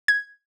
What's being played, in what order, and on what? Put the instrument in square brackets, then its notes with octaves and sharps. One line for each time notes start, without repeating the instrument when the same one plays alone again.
[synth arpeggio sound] G#6